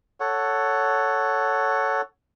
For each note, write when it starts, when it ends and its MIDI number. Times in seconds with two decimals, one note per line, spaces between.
0.20 2.01 69
0.20 2.01 73
0.20 2.01 78